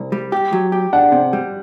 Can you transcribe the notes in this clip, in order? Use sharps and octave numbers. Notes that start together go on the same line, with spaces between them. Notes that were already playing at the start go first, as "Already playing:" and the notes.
Already playing: C2
G3
G4
F#3
G4
D4 F#5
C3
G3